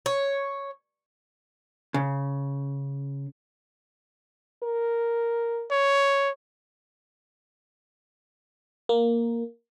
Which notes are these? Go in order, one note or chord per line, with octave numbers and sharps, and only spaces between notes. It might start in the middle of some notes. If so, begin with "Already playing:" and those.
C#5
C#3
A#4
C#5
A#3